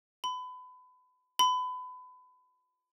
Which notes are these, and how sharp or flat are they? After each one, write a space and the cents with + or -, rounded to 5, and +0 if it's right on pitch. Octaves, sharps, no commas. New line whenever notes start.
B5 +30
B5 +30